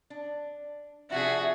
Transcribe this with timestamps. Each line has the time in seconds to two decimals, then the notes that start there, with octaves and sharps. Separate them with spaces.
0.10 D4
1.10 C3 F3 D4 F#4 G#4 E5